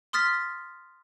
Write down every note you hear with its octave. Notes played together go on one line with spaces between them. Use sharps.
C6 D#6 F6 A6 B6